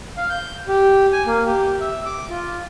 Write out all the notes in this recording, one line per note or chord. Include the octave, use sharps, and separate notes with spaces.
F5
G6
G4
G#5
A#3
G4
E5
D6
F4